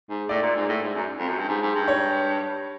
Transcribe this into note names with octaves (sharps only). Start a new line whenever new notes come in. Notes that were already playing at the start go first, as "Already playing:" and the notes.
G#2
A2 D5
A#2
G#2
A2
G#2
F#2
F2
F#2
G2
G#2
G#2
G2
C#5